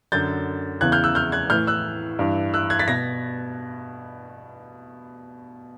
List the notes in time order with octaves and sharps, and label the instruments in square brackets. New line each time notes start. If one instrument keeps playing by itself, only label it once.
[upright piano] F#2 D3 G6 A6
E2 C#3 E3 F#6 G#6
F6 G6
E6 F#6
F6 G6
F#6 G#6
A2 E3 F6 G6
E6 F#6
G2 E3
E6 F#6
F#6 G#6
A6 B6
B2 G#6 A#6